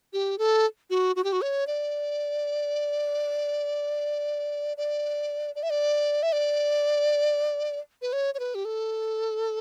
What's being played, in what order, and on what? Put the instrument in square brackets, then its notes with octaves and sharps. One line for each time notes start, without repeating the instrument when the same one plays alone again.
[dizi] G4
A4
F#4
F#4
G4
F#4
C#5
D5
D5
D5
E5
D5
E5
D5
B4
C#5
C#5
B4
G4
A4